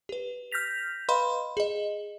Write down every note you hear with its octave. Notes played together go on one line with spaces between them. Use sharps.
G4 B4
F6 G6 A#6 B6 F7
B4 D#5 F5 B5 C6
G#4 D#5